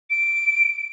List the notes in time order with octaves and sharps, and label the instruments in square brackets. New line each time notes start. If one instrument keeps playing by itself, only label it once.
[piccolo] D7